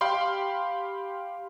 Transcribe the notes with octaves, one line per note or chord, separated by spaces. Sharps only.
G4 F5 G5 B5 C6